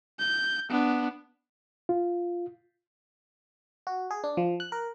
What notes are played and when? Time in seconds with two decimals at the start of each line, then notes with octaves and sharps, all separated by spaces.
0.19 G6
0.69 B3 D4
1.89 F4
3.87 F#4
4.11 G#4
4.24 D4
4.37 F3
4.60 F#6
4.72 A#4